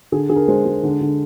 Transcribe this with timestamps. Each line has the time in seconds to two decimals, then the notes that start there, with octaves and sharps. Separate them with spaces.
0.12 D3 G#4
0.29 D3 G#4
0.36 A#4
0.48 G#3 C5
0.65 G#3
0.83 D3
1.01 D3